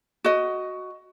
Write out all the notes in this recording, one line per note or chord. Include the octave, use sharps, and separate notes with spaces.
F#4 D#5